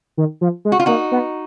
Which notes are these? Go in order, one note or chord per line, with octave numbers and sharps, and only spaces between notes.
D#3
F3
G#3
F#4
F4
A#3 D#4 F#4
B3